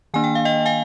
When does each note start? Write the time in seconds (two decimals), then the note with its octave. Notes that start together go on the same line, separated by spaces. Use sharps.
0.14 D#3 A#3 D4 G#5
0.24 G5
0.35 F5
0.45 D#5 G5
0.66 F5 G#5